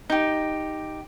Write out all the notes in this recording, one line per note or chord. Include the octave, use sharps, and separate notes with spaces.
D#4 G4